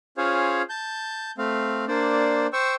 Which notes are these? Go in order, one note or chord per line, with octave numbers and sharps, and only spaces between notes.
C#4 F4 G#4 C5 C#5 F5
A5 G6
A3 C4 F5
A#3 D4 C5 D5
C5 G5 C#6 E6